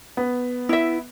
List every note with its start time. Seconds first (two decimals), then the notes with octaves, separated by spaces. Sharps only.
0.17 B3
0.69 E4 E5